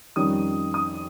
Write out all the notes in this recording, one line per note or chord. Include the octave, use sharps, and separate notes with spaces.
F2 D#3 G3 C#4 D#6
D#6